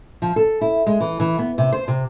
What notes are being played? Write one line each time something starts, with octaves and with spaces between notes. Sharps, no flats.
F3
A4
E4
G#3
E3
E3
B3
C3
C5
C3